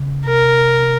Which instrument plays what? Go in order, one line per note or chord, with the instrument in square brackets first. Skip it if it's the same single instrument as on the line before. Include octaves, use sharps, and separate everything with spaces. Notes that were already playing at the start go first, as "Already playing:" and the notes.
Already playing: [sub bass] C#3
[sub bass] C3 [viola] A#4